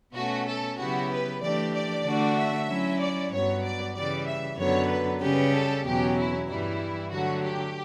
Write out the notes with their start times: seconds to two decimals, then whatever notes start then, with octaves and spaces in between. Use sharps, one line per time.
0.15 B2 A3 C#4 F#4
0.47 A4
0.78 C#3 F#3 B3 E4 F#4 G4
1.10 B4
1.41 E3 A3 D4 G4 D5
1.74 D5
2.05 D3 A3 D4 F#4
2.37 E5
2.68 F#3 C#4 E4
3.00 D5
3.31 G2 F#3 B3 C#5
3.63 D5
3.95 C#3 E3 G3 D5
4.26 E5
4.58 F#2 D3 F#3 B3 C#5
4.89 B4
5.21 C#3 G3 C#4 G4 B4
5.53 A4
5.85 E2 B2 F#3 C#4 G4
6.16 E4
6.48 G2 E3 G3 E4
7.11 D3 F#3 A3 F#4
7.43 G4